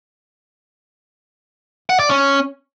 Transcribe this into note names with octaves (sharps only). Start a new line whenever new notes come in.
F#5
D5
C#4